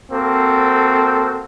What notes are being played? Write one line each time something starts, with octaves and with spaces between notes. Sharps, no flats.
A#3 C4 F#4 A4